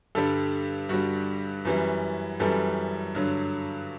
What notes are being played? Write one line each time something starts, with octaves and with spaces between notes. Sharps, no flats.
G2 D3 G3 A4
G2 D3 G3 F#4
F#2 E3 G3
F#2 E3 G3 A4
G2 D3 F#3